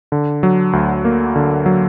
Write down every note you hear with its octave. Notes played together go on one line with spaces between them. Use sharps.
D3
F#3
D2
A#3
D3
F#3